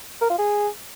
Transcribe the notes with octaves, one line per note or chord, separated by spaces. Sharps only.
A#4
F4
G#4